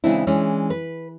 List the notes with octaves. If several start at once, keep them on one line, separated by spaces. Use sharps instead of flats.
C#3 E3 G#3 C4 D4 E4
E3 G#3 C#4 D4
B4